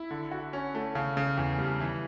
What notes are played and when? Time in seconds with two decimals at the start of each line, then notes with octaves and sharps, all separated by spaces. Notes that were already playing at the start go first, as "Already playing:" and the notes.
Already playing: E4
0.11 D3
0.31 F#4
0.53 C#4
0.75 A3
0.95 C#3
1.17 C#3
1.37 E2
1.58 G3
1.80 E3